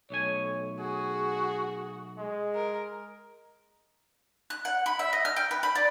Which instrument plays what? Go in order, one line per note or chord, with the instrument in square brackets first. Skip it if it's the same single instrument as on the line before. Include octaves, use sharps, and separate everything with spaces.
[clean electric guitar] B1 A3 G#5 [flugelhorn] C#5
[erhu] F#4 [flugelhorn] G#4
[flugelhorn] G#3
[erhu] A#4
[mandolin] F#6
F#5
B5
E5
D#5
F6
G5
B4
B5
D5